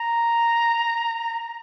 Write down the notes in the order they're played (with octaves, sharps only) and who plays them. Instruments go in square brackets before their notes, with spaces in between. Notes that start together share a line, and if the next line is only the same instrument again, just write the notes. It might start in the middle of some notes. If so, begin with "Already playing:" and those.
Already playing: [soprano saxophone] A#5